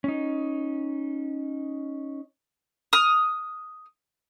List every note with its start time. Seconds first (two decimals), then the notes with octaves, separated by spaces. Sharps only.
0.04 C#4 D#4
2.93 D#6 F6